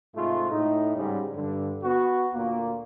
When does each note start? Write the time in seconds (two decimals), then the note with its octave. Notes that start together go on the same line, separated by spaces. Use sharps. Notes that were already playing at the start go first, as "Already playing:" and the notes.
0.15 G#2 C3 G#3 A3 F4
0.51 A2 D#4
0.95 G#2 C#3 G3
1.35 G2 D3
1.83 B3 F#4
2.34 D2 A#2 A#3